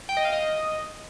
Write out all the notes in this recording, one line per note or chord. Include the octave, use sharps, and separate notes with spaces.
G5
D#5
F5
D#5